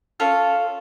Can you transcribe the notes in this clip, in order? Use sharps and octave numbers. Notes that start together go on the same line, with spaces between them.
C#4 F4 A4